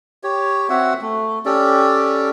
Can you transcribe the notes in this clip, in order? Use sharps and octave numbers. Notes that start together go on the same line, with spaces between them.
G4 C#5
C4 F#4 E5 F#5
A3
C#4 G4 A4 D5